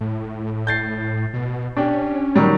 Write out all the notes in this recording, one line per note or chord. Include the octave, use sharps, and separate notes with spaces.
A2
G6 A6 C7
B2
C#4 D4 G4
D#3 F#3 G3